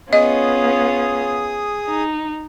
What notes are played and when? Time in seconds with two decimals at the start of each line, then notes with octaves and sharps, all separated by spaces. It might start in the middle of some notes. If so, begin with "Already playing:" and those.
0.13 B3 C#4 F4 G#4 D#5 D#6
1.88 D#4